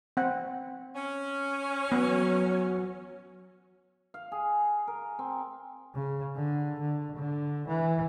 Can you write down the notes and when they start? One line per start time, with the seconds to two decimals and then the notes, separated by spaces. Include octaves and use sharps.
0.17 C4 F#5
0.95 C#4
1.92 F#3 B3
4.14 F5
4.32 G#4
4.87 A#4
5.19 C4
5.95 C#3
6.36 D3
6.80 D3
7.16 D3
7.68 E3